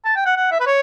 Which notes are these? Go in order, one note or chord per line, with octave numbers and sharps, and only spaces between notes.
A5
G5
F#5
F#5
E5
B4
C#5